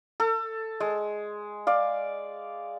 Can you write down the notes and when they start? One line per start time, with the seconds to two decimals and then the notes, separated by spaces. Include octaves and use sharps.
0.20 A4
0.80 G#3
1.67 D5 F5